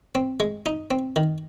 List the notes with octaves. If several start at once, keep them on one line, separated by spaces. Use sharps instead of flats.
C4
G#3
D#4
C4
D#3